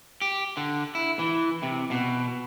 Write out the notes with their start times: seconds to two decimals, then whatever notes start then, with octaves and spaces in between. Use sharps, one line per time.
0.21 G4
0.57 D3
0.95 E4
1.19 E3
1.63 C3
1.91 B2